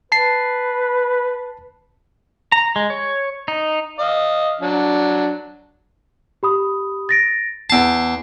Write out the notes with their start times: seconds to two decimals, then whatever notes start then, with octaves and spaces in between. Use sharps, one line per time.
0.12 B4 A5 C7
2.52 A#5
2.76 G#3
2.90 C#5
3.48 D#4
3.99 D#5 F5
4.61 F#3 D4
6.43 G4 B5 D#6
7.09 A6 A#6 D7
7.70 E2 A5 C7 D7